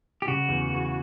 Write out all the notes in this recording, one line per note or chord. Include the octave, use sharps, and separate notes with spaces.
G4
C#3 F#4
E2
E3